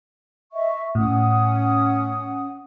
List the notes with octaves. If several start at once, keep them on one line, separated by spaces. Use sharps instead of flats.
D#5 E5 C#6
A2 C#4 F#5 D#6